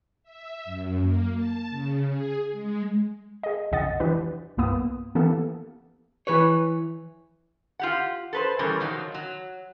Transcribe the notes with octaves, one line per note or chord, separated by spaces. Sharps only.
E5
F#2
A#3
A5
C#3
G#4
G#3
G#4 D#5
B1 F2 C#3 D#5 F#5 A6
E3 F3 D4 G4 B4
C2 G2 A#3 B3 D#6
E3 A#3 B3 E4 G4 A4
E3 B4 C#5
F4 G4 F#5
A4 B4 C5
B2 E3 G3 C#4 G#4 A#4
A#2 D#3 F3 F#3 A#3
F#3